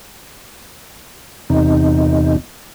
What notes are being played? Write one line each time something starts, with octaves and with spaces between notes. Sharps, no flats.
E2 C3 D#4